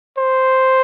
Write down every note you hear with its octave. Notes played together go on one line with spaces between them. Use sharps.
C5